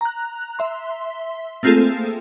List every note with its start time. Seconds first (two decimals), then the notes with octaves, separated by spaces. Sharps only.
0.01 A#5 F#6
0.59 E5 C6
1.63 A3 A#3 C4 F4 G#4 A4